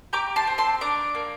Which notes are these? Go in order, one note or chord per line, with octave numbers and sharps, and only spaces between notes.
G4 A#5 D6
A5 C6
C4
A5 C6
D4 A#5 D6
A#3